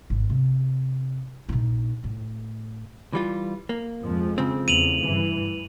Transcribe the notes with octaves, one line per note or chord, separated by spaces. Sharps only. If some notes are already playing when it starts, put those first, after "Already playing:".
G#1
C3
A#1 D#4
A2
E3 G3 F4
A#3
F2 F3 G#3
C#3 C4
E2 A3 D#7 F7 F#7
G2 E3